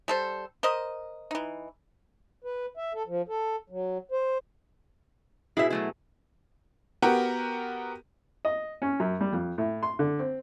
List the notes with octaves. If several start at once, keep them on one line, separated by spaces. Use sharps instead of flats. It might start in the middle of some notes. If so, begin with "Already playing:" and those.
G3 A4 C5
A#4 C5 D#5
E3 D#4
B4
E5
A4
F3
A4
F#3
C5
B2 E4 G#4 E5
F#3 A3 E4
B3 F#4 G4 A#4
D#5
C#4
F#2
G3
F2
A2
C6
D3
C4